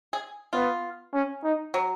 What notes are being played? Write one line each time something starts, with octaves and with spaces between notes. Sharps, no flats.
G#4
B3 F4
C#4
D#4
F#3